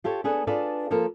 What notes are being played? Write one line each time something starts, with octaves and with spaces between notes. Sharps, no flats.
F4 G4 A4 C#5
B3 D4 G#4 A4 B4
D4 F4 G#4 A4 B4 D5
F3 A#3 A4 A#4